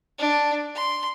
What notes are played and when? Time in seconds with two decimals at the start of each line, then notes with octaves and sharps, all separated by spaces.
0.18 D4
0.75 C6